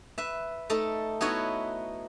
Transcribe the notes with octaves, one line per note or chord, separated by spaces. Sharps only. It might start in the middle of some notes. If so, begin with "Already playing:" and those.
B4 E5
A3 D#4 A4
B3 D#4 E4 F#4 B4 C#5